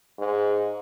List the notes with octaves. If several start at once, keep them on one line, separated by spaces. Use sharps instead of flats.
G#2